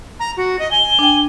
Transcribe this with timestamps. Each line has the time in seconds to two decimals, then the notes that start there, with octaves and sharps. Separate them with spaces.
0.20 A#5
0.37 F#4
0.59 D#5
0.71 G#5 G7
0.99 D4 G5